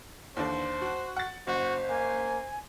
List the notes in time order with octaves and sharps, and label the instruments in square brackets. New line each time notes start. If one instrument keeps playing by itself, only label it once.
[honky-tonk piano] D#2 D4 [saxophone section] D3 E3 [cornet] C5
[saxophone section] F#4
[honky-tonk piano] F#5 A6
[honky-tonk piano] F#1 [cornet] F#4 [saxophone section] C5
[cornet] A#3 [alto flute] G#5